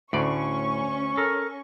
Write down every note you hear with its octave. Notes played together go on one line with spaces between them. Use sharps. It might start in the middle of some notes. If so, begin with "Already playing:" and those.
D2 A2 C#4 D5 C#6
A4 A#4